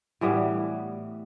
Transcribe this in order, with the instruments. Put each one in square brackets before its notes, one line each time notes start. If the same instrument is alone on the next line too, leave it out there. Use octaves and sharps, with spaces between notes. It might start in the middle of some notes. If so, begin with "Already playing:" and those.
[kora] A2 E3 G3 B3